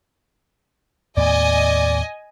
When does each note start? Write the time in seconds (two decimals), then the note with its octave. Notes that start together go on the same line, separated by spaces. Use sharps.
1.17 D#2 A2 B3 D5 D#5 G#5